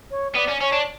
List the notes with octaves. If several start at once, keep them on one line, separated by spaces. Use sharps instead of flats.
C#5
B3 D5
C#4
C#4 C#5
D4